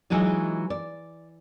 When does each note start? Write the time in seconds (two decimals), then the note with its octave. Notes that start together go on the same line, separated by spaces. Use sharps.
0.10 E3 F#3 G#3 D#4 F4
0.70 D5